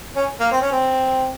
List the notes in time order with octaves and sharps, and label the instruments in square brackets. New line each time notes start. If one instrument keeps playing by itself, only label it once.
[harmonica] C#4
A#3
C4
C#4
C4